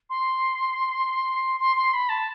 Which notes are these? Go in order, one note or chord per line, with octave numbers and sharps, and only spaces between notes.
C6
C6
C6
B5
A5